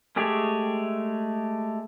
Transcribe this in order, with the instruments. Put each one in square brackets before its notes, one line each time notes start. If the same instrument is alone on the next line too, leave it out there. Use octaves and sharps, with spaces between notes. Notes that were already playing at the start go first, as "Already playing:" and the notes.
[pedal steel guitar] G#3 A3 G4 G#4 C#5